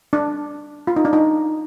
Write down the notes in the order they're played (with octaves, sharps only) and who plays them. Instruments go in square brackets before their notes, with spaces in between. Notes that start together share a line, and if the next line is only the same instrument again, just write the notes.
[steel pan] D4
F4
D#4
D4
D#4